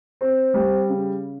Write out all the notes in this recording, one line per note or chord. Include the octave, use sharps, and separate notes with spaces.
C4
G3
C#3